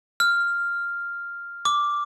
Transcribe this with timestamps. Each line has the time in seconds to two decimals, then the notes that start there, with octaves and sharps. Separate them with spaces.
0.20 F6
1.65 D6